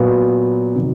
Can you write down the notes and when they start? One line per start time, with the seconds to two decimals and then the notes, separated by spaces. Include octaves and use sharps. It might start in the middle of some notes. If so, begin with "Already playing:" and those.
Already playing: A#2 F#3 B3
0.75 C3 D#3 F#3